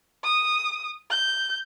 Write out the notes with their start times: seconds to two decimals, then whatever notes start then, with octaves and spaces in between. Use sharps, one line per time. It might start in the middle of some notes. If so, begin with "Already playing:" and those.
0.24 D#6
1.11 G6